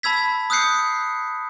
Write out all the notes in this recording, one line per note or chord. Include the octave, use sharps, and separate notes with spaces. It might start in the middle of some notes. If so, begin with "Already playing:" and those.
A5 B5 E6 G#6 B6
D#6 E6 F#6 G6 C7 C#7